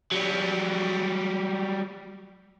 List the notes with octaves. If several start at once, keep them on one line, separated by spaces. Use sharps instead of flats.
F#3 G3